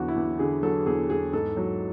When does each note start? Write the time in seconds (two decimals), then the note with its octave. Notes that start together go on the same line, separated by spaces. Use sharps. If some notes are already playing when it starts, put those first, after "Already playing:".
Already playing: E2 D3 F#3 F#4
0.08 E4
0.16 E2
0.39 D3 G#4
0.63 F#3 A4
0.86 E2 G#4
1.10 E2 G#4
1.33 G#2 A4
1.57 F#3